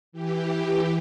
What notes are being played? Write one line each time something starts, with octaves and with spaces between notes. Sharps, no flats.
E3 G4